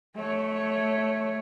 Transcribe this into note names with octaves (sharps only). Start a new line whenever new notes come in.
A3 C#5